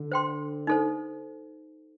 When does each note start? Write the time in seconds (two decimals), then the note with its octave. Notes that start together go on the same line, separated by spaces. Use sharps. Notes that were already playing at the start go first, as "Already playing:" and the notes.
Already playing: D3
0.12 C5 G5 C6
0.67 D#4 A4 C5